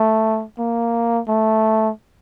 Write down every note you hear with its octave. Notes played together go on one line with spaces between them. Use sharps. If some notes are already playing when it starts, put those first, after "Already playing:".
Already playing: A3
A#3
A3